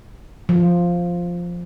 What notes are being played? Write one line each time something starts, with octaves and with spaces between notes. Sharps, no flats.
F3